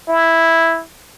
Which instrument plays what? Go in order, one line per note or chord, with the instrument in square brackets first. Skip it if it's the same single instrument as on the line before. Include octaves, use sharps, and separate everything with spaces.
[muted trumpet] E4